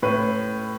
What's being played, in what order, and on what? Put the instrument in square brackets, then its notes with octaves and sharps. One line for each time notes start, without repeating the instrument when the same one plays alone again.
[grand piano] A2 B4